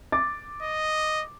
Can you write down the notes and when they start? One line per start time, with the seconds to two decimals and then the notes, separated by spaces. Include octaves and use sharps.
0.12 D6 A6
0.62 D#5